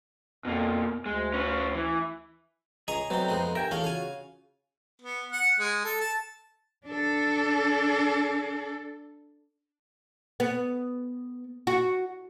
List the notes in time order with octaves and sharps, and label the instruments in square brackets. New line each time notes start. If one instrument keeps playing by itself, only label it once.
[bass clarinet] F2 [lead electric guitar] B2 A#3
[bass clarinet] D2 [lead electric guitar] G#3
[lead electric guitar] C#4 B4
E3
[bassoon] C#2 [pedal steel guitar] G#4 [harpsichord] D#5 A#5 C#6
[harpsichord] F#3 D#4 [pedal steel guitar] A3 C4 [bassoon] B3
[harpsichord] F2 G#3 D#4
[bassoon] G2 [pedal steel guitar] A#4 G5 G#5 [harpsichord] E5
[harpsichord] E2 C#4 F5 [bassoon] A3 [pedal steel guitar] F4 F#4
[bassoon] C#3 [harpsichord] F5 G#5
[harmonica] B3
F#5
G#3
A4
A5
[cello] D4 A4
[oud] B3
F#4